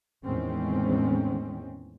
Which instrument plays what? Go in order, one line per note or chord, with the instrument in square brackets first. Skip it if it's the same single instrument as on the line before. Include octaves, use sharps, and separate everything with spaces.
[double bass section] E2 A2 D#3 G#3 C4 C#4